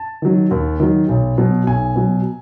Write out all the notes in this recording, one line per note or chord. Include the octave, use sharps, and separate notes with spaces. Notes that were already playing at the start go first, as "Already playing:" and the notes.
Already playing: A5
D#3 F#3
D#2
D#3 F#3
B1
B2 F#3
B1 G#5
B2 F#3